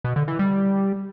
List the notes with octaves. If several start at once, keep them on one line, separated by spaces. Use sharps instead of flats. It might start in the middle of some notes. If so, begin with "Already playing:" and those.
B2
D3
E3
G3